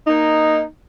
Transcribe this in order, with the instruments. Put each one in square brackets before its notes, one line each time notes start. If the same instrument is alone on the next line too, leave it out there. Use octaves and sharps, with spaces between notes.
[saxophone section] A#3 D#4